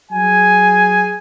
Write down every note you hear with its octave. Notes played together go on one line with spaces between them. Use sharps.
F#3 G#4 G#5